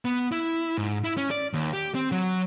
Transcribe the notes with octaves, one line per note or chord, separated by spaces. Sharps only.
B3
E4
G#2
E4
C#4
D5
D#2
G4
C4
F#3